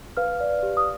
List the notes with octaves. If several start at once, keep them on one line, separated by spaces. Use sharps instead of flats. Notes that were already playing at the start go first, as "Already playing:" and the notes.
B4 F5 F6
D5
G4
D#6